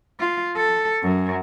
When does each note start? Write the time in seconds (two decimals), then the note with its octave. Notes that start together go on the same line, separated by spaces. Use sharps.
0.20 F4
0.57 A4
1.03 F#2